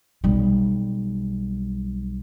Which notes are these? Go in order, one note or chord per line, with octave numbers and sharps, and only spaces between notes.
B1 G3